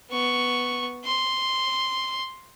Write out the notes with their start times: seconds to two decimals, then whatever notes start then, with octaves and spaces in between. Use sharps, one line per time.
0.11 B3 C#6
1.05 C6